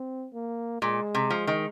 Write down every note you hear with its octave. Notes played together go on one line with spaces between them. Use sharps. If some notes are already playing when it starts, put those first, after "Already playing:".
Already playing: C4
A#3
A#2 G#3
C3
F3
D#3